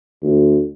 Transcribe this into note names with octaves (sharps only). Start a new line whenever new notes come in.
D2